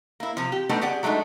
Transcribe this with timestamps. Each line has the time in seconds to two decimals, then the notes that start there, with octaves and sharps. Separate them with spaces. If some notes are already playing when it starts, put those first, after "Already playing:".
0.20 A#3 E4
0.37 C3 F3
0.52 G4
0.69 G3 A3 B3 D4 D#4 G4
0.81 G4 G#4 D5 F#5
1.03 F#3 G#3 A3 D4 D#4